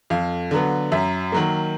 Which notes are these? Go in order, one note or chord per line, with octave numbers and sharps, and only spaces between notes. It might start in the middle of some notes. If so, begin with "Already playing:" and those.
F2 F5
D3 F#3 B3
F#2 E5
D#3 F#3 A#3